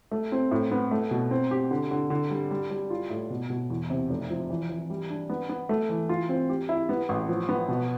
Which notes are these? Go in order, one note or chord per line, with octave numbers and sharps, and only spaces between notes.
A3
C4
A2
B3
A3
B2
C4
G4
D3
D3
D3
G3
G3
G3
F4
A2
B2
B2
E2
C3
F1
F3
E3
E3
G3
D4
B3
B3
A3
E3
F4
C4
G4
E4
B3
A1
F3
B3
B2